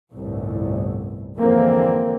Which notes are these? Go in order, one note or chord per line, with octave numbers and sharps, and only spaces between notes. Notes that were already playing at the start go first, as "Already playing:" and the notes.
G1 C2 A2
F2 G#2 D3 E3 A#3 C4